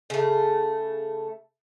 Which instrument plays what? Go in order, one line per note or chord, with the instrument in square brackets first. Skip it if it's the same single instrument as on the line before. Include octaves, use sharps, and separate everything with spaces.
[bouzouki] C#3 A3